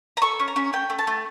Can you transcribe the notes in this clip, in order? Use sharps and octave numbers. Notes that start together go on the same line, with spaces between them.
A#5
A4 C#6
C#4
A#5
C#4
A3 G5
A3
A5
A3